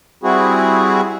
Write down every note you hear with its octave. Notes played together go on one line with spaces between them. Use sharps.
G3 C4 E4 F#4 G#4